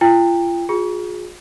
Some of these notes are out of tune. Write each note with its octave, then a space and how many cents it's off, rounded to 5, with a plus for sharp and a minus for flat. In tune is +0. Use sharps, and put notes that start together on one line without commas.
F4 -35 G5 +25
F4 +40 G#4 +0